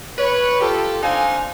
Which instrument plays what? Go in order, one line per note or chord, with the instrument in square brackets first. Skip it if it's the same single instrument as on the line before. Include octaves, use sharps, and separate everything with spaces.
[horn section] B4 C#5
F4 G4 A4
C4 D4 D#4 F5 G#5